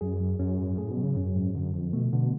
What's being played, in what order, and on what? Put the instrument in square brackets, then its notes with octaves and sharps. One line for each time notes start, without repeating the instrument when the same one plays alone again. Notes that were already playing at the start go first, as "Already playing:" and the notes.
[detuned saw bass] F#2 [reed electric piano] G#4
[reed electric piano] F#3
[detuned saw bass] F#2 [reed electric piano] C#4
[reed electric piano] G#2
[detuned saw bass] A2 [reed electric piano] G#4
[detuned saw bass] B2
[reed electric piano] F#3
[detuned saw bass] C#3
[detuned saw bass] F#2 [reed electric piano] C#4
[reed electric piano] G#2
[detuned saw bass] F#2 [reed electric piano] D3
[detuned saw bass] F2 [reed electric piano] F3
[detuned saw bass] B2 [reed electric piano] A3
[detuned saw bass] B2 [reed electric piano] D3